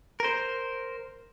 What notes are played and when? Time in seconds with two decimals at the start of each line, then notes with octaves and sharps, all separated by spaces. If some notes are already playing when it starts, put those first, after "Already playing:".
0.20 A#4 C5